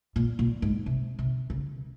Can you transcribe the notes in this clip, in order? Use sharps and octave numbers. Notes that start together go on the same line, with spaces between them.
A#2
A#2
G#2
C3
C3
C#3